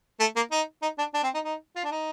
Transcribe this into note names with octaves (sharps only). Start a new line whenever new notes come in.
A3
A#3
D#4
D#4
D4
D4
C4
D#4
D#4
F4
D4
D#4